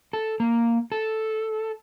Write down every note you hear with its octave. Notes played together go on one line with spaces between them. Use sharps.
A4
A#3
A4